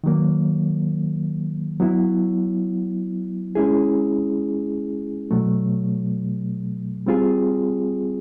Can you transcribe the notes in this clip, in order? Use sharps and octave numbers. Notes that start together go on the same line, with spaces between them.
D#3 F#3 A#3
F#3 B3 E4
G#3 C#4 E4 G#4
B2 F#3 A3
G3 C4 F4 G#4